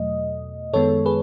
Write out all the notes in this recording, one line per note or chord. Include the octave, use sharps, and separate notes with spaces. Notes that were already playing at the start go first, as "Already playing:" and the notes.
Already playing: E2 B2 F#3 A3 D#5
F#2 D#3 G#3 B3 A4 C#5
G#4 B4